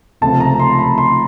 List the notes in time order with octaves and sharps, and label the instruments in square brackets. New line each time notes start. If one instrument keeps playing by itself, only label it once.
[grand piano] C#2 C3 F3 A3 A5
A#5
C6
B5
C6